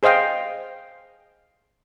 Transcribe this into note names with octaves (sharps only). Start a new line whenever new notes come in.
G#4 C5 D#5 F5 G5